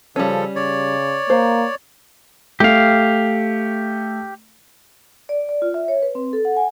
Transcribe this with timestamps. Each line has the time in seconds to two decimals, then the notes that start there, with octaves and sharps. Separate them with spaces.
0.16 C#3 F3 G3 C#4 A4
0.56 C#3 C#5 D5
1.30 A#3 C5
2.60 A3 G4 F5
5.29 D5
5.49 D5
5.62 F4
5.74 E5
5.88 C#5
6.03 B4
6.15 C4
6.33 A4
6.45 F#5
6.57 G#5